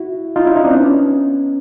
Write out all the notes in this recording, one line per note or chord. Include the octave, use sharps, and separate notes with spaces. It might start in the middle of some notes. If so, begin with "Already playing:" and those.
Already playing: E4 F#4
D#4 F4
D4 E4
C#4 D#4
C4 D4
B3 C#4